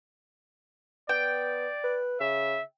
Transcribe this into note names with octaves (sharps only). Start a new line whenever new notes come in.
B3 D5 G5
B4
C#3 E5